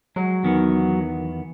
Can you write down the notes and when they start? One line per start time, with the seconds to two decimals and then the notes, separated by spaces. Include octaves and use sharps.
0.16 F#3 G#3
0.44 E2 D#3 B3